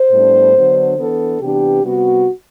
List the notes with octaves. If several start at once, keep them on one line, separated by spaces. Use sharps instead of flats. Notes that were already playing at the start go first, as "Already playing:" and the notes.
Already playing: C5
A2 G3 B3 D4
D3 F#3 B3 D4
E3 B3 D4 A4
C3 E3 B3 D4 G4
C3 G3 B3 F#4